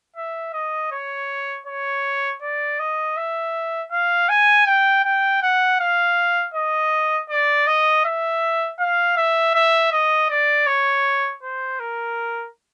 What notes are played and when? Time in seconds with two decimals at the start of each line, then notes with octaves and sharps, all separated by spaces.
0.16 E5
0.54 D#5
0.92 C#5
1.67 C#5
2.42 D5
2.80 D#5
3.17 E5
3.92 F5
4.29 G#5
4.67 G5
5.05 G5
5.42 F#5
5.80 F5
6.54 D#5
7.30 D5
7.67 D#5
8.05 E5
8.80 F5
9.17 E5
9.55 E5
9.92 D#5
10.30 D5
10.67 C#5
11.43 C5
11.80 A#4